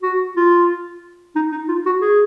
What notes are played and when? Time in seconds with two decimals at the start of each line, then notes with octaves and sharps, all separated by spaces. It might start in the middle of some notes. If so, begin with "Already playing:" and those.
0.03 F#4
0.36 F4
1.36 D#4
1.52 D#4
1.68 F4
1.86 F#4
2.01 G#4